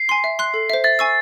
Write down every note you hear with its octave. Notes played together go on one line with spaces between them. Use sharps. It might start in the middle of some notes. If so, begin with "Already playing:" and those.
Already playing: C7
G#5 C6
E5
C6 F#6
A4
C5 E5
E5 A6
G#5 C#6 E6